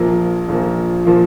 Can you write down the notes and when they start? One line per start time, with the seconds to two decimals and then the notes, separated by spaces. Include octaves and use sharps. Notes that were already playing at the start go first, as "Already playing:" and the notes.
Already playing: A#1 A#2 F3 A#3
0.48 A#1 A#2 F3 A#3
1.05 A#2 F3 A#3